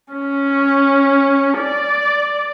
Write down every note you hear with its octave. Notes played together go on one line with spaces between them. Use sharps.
C#4
D5